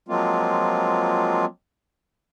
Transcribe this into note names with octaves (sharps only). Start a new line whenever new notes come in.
F3 F#3 G#3 A#3 C4 F4